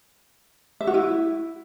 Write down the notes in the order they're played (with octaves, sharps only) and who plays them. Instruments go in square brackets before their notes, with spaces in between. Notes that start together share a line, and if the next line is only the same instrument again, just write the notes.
[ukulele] E5
F#4
E4